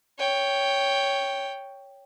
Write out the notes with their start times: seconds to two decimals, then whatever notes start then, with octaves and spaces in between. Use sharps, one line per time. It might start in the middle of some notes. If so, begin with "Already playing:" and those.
0.19 C#5 G5